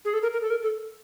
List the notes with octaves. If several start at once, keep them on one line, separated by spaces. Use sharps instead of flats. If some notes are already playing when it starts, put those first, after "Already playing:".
G#4
A4
A#4
A#4
A4
A#4
A4